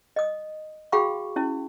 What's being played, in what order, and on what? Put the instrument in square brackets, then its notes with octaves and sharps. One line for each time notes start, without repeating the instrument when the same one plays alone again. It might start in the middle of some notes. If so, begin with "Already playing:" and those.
[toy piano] D#5 D#6
F#4 G#4 F5 G5 B5 C#6
C#4 E4